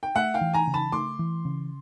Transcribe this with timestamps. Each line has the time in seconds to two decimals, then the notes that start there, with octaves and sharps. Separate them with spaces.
0.03 G5
0.15 A3 E5 F#5
0.34 F5 G5
0.41 E3
0.54 G#5 A#5
0.67 C#3
0.74 A5 B5
0.92 A3 C6 D6
1.19 E3
1.45 C#3